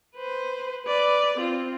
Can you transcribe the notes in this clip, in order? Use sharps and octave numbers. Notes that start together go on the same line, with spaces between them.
B4 C5
B4 D5
C4 F4